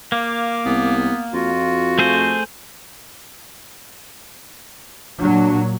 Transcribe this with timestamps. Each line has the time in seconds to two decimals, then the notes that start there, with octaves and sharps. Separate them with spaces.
0.12 A#3 F5 D6
0.65 C2 B3
1.33 F2 F4 F#4
1.99 A3 G#4 C5
5.19 A#2 F#3 D4